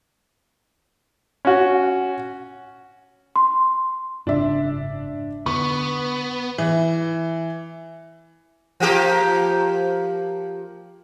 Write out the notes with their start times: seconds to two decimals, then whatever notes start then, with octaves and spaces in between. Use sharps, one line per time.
1.45 C#4 F#4
3.36 C6
4.27 F#1 G#2 C#3 D4 E5
5.46 D3 B3 C#6
6.58 E3
8.80 F3 A#3 G4